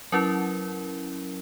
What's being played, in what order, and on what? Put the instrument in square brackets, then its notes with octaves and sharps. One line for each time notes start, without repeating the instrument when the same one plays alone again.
[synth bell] F#3 C#4 E4 A#4